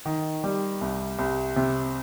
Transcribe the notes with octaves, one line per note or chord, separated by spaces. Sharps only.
D#3
G3
C2
C2
C3